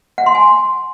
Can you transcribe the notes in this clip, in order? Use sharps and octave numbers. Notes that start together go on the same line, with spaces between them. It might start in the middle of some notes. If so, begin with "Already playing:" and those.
F#5
C6
G#5